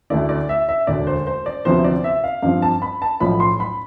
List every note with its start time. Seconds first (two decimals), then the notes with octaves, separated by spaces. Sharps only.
0.10 D2 D3 A3 E4 D5
0.29 D5
0.49 E5
0.69 E5
0.87 E1 D2 D3 D5
1.07 C5
1.27 C5
1.46 D5
1.65 D2 C3 F3 B3 E4 C5
1.84 D5
2.04 E5
2.24 F5
2.43 G2 F3 C4 F5
2.62 A5
2.82 B5
3.02 A5
3.20 B1 A2 F3 B5
3.40 C6
3.60 B5